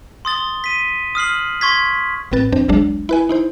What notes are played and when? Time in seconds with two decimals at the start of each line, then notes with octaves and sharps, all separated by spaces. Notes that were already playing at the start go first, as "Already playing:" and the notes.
0.25 C6 D#6 A6 G7
0.64 B6 D#7
1.15 D#6 F6 C7 F#7
1.61 C6 C#6 G#6 B6
2.32 A1 A2 C4 B4 A6
2.52 F2 C4 D4 C5
2.68 G#1 D2 F#3 G#3 D4
3.09 E4 B4 G#5
3.29 D#4 E4 C5